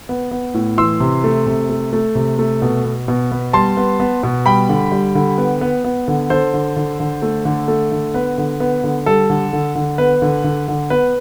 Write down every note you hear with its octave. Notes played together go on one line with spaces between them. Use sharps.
B3
B3
A2
E3 C6 E6
C3
A3
C3
A3
A3
C3
A3
B2
B3
B2
B3
G3 A5 C6
B3
B3
B2
G3 G5 B5
D3
G3
D3
B3
B3
B3
D3
D3 A4 C5
D3
D3
D3
A3
D3
A3
D3
B3 B4
D3
B3
D3
G3 A4
D3
D3
D3
B3 B4
D3
D3
D3
B3 B4